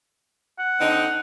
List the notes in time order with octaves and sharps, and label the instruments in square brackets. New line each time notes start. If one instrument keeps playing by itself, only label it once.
[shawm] F#5
[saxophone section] D3 C4 D#4